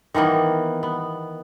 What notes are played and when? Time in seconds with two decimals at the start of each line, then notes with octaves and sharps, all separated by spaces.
0.14 D#3 E3 A#3 B3
0.83 B3